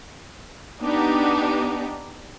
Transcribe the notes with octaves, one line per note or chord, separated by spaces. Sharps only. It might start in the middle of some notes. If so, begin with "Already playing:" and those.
B3 D4 D#4 G4